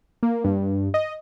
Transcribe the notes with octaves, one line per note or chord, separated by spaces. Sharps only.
A#3
G2
D#5